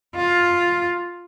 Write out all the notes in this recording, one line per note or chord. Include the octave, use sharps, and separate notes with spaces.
F4